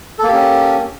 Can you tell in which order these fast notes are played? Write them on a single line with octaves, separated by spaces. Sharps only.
A4 A#3 G4 C#4